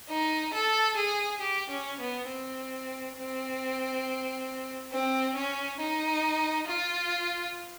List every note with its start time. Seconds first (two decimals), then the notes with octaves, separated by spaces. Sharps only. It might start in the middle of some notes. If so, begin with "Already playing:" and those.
0.09 D#4
0.54 A4
0.97 G#4
1.41 G4
1.70 C#4
2.00 B3
2.28 C4
3.17 C4
4.92 C4
5.36 C#4
5.79 D#4
6.67 F4